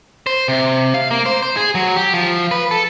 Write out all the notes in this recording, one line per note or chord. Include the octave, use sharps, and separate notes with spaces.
C5
C3
F5
A#3
C5
C5
G#4
F#3
G4
F3
B4
A4